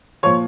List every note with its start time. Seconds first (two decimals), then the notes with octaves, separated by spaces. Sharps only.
0.23 A#2 F3 C#5 C#6